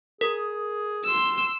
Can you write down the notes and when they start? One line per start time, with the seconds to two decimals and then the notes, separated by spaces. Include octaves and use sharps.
0.21 G#4 A#4
1.04 C6 E6